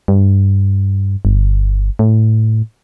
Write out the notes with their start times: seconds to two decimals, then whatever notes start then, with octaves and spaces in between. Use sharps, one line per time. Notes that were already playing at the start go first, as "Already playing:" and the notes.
0.08 G2
1.25 G1
1.99 A2